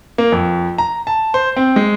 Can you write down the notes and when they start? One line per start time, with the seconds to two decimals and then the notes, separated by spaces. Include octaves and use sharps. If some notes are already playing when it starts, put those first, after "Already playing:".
0.18 A#3
0.32 F2
0.78 A#5
1.07 A5
1.34 C5
1.57 C4
1.76 G#3